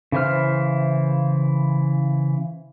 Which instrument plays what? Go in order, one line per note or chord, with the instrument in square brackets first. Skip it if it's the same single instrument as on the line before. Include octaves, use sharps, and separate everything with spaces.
[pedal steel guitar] C#3 E3 E4 C5 F6